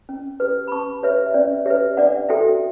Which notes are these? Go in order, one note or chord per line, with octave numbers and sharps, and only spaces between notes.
C#4
G4 B4
B5
C#4 A5 C#6
G4 B4 C#5 E5
E5
C#4 D5
G4 B4 C#5 E5
D4 D5 F#5
F#4 A4 E5 G5